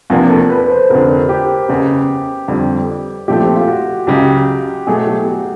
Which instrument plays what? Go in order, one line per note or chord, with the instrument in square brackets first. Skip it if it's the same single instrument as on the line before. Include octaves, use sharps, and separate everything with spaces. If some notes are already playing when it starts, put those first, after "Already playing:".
[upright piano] E2 C3 F3 A#3 D4 [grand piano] F4
[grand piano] A4
B4
C5
[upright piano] F1 F2 D3 [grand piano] A#4
[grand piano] G4
[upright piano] F#1 E2 C#3
F2 D3 G3
[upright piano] A#1 A#2 F3 A3 C4 [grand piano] G4
[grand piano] F4
F#4
[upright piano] C#2 C#3 F#3 [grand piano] G4
[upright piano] B2 F#3 A3 [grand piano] G#4
[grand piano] G4
F#4